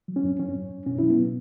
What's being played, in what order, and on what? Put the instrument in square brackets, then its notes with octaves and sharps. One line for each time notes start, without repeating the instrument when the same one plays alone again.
[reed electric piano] F#3
C#4
F#2
F#3 C#4
F#2
F#2
B2 C#4
F#3 E4
B3
B2